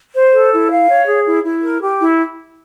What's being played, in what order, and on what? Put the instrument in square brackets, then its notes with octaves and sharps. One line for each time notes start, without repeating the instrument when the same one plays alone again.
[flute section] C5
A4
E4
F5
C#5
G#4
E4
E4
A#4
G4
E4